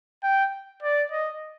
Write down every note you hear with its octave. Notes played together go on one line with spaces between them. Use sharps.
G5
D5
D#5